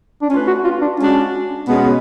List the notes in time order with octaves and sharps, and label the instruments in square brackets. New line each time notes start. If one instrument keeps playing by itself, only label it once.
[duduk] D4
[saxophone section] A3 F4 B4 [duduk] C#4
[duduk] F#4
F4
D4
[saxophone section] G#3 D4 F#4 [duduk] C#4
[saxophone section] B2 G#3 C#4 [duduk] B3